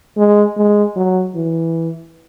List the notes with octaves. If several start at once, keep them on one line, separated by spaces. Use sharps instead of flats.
G#3
G#3
F#3
E3